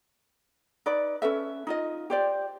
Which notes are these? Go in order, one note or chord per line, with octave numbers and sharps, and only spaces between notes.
D#4 B4 D5
C#4 A4 B4 E5
D#4 F4 D#5
G4 C5 D5